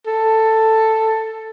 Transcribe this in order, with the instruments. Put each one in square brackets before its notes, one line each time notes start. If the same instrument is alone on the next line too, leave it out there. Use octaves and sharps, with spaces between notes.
[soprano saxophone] A4